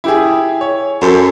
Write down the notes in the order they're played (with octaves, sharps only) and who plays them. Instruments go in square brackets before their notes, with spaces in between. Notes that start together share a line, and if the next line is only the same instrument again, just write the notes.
[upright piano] E4 G4 G#4
C#5
[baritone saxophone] F#2 [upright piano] A4 C5